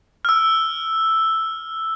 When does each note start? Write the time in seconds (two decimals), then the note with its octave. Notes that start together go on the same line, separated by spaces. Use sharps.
0.25 E6 F6